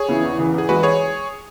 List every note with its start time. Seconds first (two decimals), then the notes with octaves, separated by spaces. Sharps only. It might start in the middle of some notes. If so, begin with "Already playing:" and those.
Already playing: G#4 C#5
0.08 C#3 E3 B3 E4
0.23 E2
0.38 C#3 E3
0.53 E2
0.58 G#4
0.68 E3 G#3 E4 F#4 B4
0.83 G#4 C#5